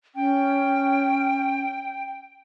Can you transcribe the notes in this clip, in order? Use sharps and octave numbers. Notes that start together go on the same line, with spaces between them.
C#4 G5